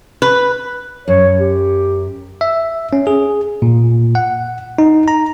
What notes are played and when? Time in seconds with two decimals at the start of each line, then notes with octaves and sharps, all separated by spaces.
0.22 B4
1.08 F#2 C#5
1.38 G4
2.41 E5
2.93 C#4
3.07 G#4
3.62 A#2
4.15 F#5
4.78 D#4
5.08 A#5